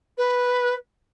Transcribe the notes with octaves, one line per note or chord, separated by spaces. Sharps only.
B4